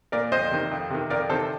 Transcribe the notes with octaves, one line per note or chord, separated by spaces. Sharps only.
A#2 A#4 D5
F2 C5 D#5
C3 D#3
F2
C3 D#3
F2 A#4 D5
C3 D#3 A4 C5